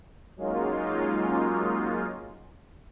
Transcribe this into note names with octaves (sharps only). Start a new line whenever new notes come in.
F#3 G#3 A#3 C#4 D#4 F4